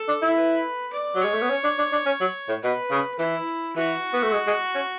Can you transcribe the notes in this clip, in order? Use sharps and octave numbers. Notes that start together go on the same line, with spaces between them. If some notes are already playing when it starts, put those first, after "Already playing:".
Already playing: A4
D4
E4
B4
D5
F#3
G#3 C#5
A3
B3
C#4
D4
D4
D4
C#4
F#3
A2
B2 B4
C#3
E3 E4
E3 F#4
B3
A3
G#3
G#3
C#4